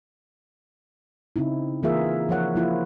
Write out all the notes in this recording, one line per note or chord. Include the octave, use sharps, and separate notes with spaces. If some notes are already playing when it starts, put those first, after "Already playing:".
C#3 C4 D#4 E4
E3 A#3 F4 G#4 A#4 E5
F3 A#4 C#5 F#5
F3 A#3 E4 F4